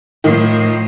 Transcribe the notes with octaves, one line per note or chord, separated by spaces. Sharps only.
A2 D#3 F3